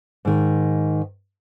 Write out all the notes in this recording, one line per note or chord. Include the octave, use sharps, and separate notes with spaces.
G#2 D#3